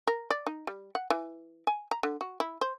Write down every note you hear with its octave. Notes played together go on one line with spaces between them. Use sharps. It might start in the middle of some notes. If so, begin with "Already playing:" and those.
A#4
D5
D#4
G3
F#5
E3
G#5
A#5
D3
F#4
E4
C5